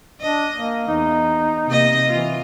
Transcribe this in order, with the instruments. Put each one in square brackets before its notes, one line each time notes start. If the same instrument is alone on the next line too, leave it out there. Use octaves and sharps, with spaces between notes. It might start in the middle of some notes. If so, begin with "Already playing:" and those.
[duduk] D4 [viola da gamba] D#5
[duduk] A#3
[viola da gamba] E2 [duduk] D#4
[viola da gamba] C3 A#3 D#5
[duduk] E3 [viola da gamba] F4